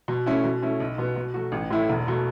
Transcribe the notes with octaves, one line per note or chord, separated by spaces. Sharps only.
B2
A3 C#4 E4
B2
A3 C#4 E4
B1
B2 B3
B2
F#3 A3 F#4
A1
A2 A3 E4
E1
B2 A3